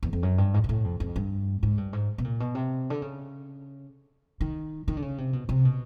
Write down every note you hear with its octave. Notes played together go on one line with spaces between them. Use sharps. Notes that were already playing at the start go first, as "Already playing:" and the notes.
E2
F2
F#2
G2
G#2
A#2
A2
F2
F2
G2
G#2
G2
G#2
B2
A#2
B2
C3
D3
C#3
D#3
D#3
D3
C#3
C3
B2
C3
B2